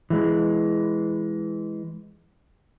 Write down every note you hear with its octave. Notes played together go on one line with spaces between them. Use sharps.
E3 G#3